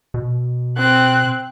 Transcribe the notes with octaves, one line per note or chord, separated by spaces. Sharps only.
B2
C4 F#6